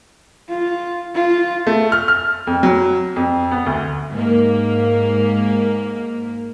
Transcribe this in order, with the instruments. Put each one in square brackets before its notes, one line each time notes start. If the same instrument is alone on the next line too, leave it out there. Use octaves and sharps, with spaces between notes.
[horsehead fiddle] F4
F4
[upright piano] A3
F6
F6
F2
F#3
F2
B3
D2
[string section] G#2 A#3